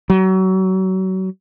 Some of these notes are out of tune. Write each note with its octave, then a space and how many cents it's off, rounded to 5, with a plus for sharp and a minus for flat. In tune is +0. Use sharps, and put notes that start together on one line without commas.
F#3 +30